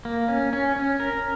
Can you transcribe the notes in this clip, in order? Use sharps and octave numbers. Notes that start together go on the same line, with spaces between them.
A#3
C#4
C#4
C#4
A#4